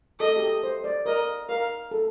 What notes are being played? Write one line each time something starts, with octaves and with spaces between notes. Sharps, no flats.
A4 D#5
G4
A4
C5
D5
A#4 D#5
A#4 F5
A4